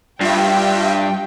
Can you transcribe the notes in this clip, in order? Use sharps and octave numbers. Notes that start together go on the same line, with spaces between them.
G2 F4 G4 E5 G5